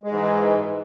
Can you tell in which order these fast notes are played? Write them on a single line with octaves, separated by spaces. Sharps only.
G#3 G#2 E3